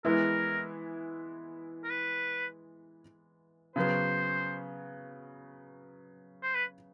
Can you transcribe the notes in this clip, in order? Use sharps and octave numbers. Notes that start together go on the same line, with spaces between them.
E3 G#3 B3 E4 A#4
A#4
B4
C#3 F#3 B3 C5
C5
B4